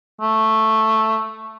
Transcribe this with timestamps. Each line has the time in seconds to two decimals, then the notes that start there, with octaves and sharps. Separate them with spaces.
0.21 A3